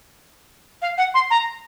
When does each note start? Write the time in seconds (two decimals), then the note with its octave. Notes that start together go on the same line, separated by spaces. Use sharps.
0.82 F5
0.98 F#5
1.14 C6
1.31 A#5